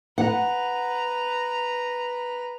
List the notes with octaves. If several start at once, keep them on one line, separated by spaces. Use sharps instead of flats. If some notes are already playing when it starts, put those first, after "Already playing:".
B4 F#5 A#5